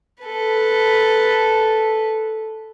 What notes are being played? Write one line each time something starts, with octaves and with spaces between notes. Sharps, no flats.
A4 B4